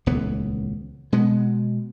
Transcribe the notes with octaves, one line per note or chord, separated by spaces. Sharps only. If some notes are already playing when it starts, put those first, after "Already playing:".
D#1 C#2 E3 B3
B2 G#3 B3